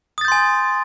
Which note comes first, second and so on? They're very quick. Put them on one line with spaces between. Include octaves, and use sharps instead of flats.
D#6 A6 G6 C6 G#5